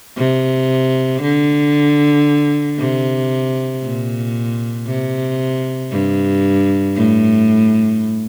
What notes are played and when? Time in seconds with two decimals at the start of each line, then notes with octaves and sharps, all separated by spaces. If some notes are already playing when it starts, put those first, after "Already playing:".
0.17 C3
1.22 D3
2.78 C3
3.83 A#2
4.87 C3
5.91 G2
6.96 A2